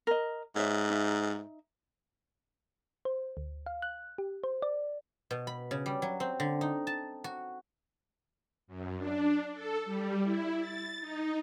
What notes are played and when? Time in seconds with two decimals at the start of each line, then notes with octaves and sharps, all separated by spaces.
0.07 A#4 D#5
0.56 G#2 C#5 E5
0.90 D#4 E5
3.05 C5
3.37 D2
3.66 F5
3.82 F#6
4.18 G4
4.44 C5
4.62 D5
5.31 B2
5.47 B5
5.71 C#3
5.86 G3
6.02 F#3
6.20 C4
6.40 D3
6.61 D#4
6.87 A5
7.24 F#4
8.67 F#2
8.98 D4
9.54 A4
9.85 G3
10.23 E4
10.60 A6
11.01 D#4